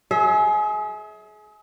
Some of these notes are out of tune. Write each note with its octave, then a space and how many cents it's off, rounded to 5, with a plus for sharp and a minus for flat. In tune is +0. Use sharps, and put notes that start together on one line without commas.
G#4 +30 E5 -35